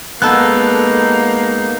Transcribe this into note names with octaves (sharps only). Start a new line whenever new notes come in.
G#3 A#3 B3 D#4 A4 F#6